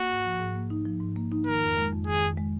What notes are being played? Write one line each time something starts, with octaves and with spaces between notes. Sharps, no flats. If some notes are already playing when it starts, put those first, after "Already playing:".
Already playing: A#3 F#4
G#2
F3
G#2
A#3
D#4
F3
G#2
A#3
D#4
D#3 A#4
F2
G#3
F2
D#3 G#4
F2
G#3